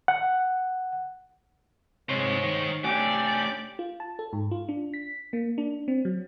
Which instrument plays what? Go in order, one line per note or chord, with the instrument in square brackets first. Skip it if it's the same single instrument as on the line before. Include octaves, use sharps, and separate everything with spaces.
[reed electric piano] F#5
[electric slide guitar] C3 G#3 [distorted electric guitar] D#4 C5 [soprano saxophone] C#5
[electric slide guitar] D#3
[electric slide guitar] A3 C#4 D4 [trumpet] G4 [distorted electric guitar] D5 [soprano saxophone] G#5
[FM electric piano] F4
A5
A4
G#2
F4
D4
B6
A#3
D4
C4
F#3